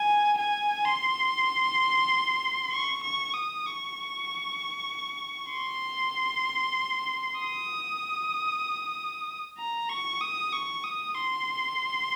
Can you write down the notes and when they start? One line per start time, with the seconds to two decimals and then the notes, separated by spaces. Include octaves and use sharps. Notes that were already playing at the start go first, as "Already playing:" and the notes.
Already playing: G#5
0.38 G#5
0.85 C6
2.72 C#6
3.04 C#6
3.34 D#6
3.66 C#6
5.53 C6
7.40 D#6
9.58 A#5
9.89 C#6
10.21 D#6
10.53 C#6
10.84 D#6
11.15 C6